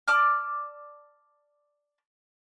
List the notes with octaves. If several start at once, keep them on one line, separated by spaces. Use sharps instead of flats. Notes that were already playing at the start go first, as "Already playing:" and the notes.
D5 A5 D6 F6